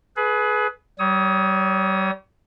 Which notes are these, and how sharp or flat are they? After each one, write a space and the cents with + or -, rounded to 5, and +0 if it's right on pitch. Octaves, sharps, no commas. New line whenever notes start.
G#4 +30 B4 +0
G3 -35 C#5 +0 D#6 +25